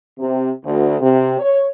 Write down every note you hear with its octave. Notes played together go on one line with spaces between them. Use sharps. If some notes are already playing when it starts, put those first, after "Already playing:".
C3
D2
C3
C#5